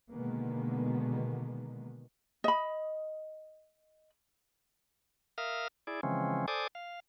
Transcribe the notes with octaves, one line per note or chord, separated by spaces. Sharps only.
B2 D3 D#3 G#3 A#3 B3
D#5 B5
A#4 E5 F5 D#6 F6
E4 G#4 D5
C#3 E3 F3 G#3 C4 C#4
A4 C5 D5 G#5 D6 D#6
F5